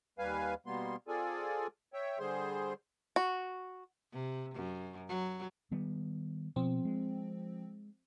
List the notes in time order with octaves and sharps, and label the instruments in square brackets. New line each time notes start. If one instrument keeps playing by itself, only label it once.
[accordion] D#2 G3 B4 F5 G#5
B2 G3 A#3 B3 C6
C4 F4 G#4 A4 D5 G#5
C#5 E5 G5
D3 G3 G#4 C5 C6
[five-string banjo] F#4
[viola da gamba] C3
F#2
F#3
[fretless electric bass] D#3 G3 B3
[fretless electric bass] B2 [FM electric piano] F3 C4
[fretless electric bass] G#3